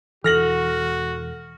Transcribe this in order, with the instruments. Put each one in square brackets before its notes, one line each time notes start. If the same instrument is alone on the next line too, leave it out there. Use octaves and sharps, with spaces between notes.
[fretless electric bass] E1 B1 E3 [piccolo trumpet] F#4 [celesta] A4 [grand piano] F6 A#6 F#7